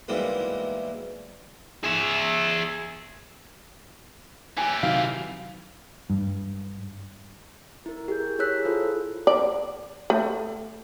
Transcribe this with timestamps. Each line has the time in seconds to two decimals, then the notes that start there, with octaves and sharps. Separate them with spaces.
0.08 B1 G#2 E3 G3 G#3 A#3
1.84 G#4 E5
4.58 E3 G4 G#5
4.83 C3 D#3 F#3 F5 F6 B6
6.10 G2
7.86 E4 A#4
8.08 G4 G#4 A#4 G6
8.39 E4 G#4 C#5 E6 F#6 B6
8.65 E4 F4 A4 C5
9.27 D5
10.10 A3